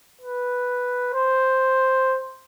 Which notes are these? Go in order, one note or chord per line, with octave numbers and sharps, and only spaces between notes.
B4
C5